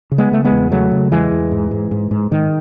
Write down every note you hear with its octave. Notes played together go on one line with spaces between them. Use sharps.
C#3
G#3 B3
C#3 A3
G#3 B3
E2
C#3 F#3 A3
C#3
E2 E3 G#3
E2
G#2
G#2
G#2
G#2
G#2 D#3